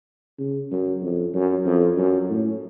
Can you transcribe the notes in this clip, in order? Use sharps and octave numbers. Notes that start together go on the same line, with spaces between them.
C#3
F#2
F2
F#2
F2
F#2
A2